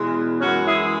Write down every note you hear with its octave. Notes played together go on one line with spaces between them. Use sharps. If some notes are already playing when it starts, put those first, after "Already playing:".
Already playing: E2 B2 G#3
F#2 E3 G#3 C#4 F#4
E4 G#4